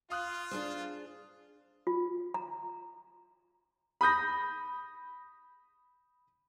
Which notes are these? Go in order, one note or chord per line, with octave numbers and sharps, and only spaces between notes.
F4 F5 D#6 F#6
D4 G#4 C5
F4
A#5
B5 D#6 G6 A#6